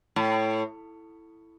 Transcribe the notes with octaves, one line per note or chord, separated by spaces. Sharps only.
A2